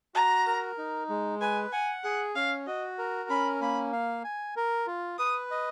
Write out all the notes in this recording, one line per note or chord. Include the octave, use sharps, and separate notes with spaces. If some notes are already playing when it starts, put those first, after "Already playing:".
F#4 A#5
A#4
D#4
G#3
B4 G#5
F#5 G#5
G#4 F#5
C#4 F5
F#4 D#5
A#4
C#4 B5
A#3 B5
F5
G#5
A#4
F4
B4 D#6
D#5